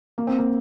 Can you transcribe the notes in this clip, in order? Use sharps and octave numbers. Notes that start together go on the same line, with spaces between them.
A#3
C4
A#3